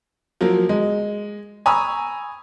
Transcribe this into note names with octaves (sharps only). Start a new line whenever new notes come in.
F3 F#3 A#3
G#3
G#5 A#5 B5 C#6 D#6 E6